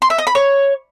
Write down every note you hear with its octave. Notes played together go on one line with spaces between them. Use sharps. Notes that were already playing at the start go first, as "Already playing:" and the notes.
C6
E5
D#5
B5
C#5